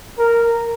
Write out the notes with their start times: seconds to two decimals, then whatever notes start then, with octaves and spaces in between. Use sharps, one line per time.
0.18 A#4